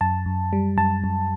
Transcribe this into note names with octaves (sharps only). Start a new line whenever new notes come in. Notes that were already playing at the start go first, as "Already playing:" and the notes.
F#2 A5
F#2
G3
F#2 A5
F#2